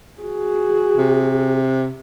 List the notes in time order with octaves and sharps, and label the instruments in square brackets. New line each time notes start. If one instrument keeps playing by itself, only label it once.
[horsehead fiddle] F#4 G#4
[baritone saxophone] C3